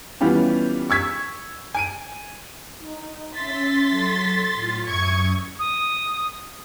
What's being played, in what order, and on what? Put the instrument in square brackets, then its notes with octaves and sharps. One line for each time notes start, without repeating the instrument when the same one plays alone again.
[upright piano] E3 G3 B3 C#4 F4 G4
C#6 E6 G#6 B6
G#5 D7 D#7
[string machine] D#4
[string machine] C#4 E5 [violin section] C6 A6 B6
[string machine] F#3 A4
A2 F4
[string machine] F#2 E5 D#6 [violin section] C#6 G#6
[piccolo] D#6